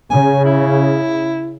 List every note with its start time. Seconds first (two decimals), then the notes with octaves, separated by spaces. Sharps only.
0.11 C#3 G#5
0.45 E4